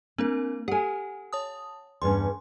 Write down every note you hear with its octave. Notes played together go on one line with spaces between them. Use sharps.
A#3 C4 D4 A#4
G4 A4 F#5 G#5
C#5 A5 D#6
E2 G2 C#4 C6